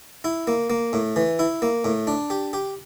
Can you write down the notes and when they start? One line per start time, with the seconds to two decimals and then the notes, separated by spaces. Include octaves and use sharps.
0.24 E4
0.47 A#3
0.70 A#3
0.93 A2
1.16 E3
1.39 E4
1.62 A#3
1.85 A2
2.07 D4
2.30 G4
2.53 G4